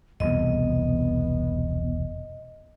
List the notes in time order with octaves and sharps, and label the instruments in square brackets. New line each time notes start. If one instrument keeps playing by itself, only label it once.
[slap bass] E1 C2 F2 [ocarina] B3 [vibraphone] D#5